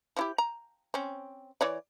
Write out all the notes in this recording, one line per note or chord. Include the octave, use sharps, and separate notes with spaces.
F3 E4 G4
A#5
C4 C#4
E3 C#5 D5